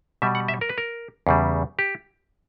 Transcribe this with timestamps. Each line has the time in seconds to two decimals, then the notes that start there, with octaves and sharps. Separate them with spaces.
0.22 B2 G3 E5
0.35 F#5
0.48 E5
0.61 A#4
0.69 B4
0.78 A#4
1.27 E2 C#3 G3
1.79 G4